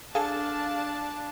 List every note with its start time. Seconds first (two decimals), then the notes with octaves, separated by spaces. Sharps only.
0.15 D4 G#4 A4 F5 A5